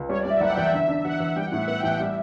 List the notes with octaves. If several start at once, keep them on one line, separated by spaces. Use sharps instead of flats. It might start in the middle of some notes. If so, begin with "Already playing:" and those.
Already playing: C#2
G3 C#5
D5
G3
E5
F#1 F#5
G5
E2 E5
D3 E5
D4
E2 F#5
E2
F#5
G3 G5
F#5
A2
E5
B3 F#5
G5
A1
G5
G3 E5